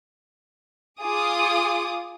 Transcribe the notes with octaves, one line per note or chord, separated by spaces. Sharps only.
F4 G#4 D6 D#6